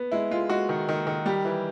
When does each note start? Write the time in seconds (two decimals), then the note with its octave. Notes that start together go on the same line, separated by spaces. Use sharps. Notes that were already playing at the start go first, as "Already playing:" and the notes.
Already playing: B3
0.12 G#3 E4
0.31 G#3 F4
0.50 G#3 F#4
0.69 D#3
0.89 D#3
1.07 D#3
1.26 G3 G4
1.45 E3